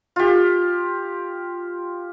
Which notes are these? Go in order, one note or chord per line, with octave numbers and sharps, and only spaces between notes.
F4 G4